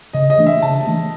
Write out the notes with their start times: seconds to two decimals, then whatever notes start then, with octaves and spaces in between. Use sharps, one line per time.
0.13 C#3 D#5
0.30 D#5
0.38 E3 A3 D4
0.47 E5
0.62 C#3 A5
0.87 E3 A3 D4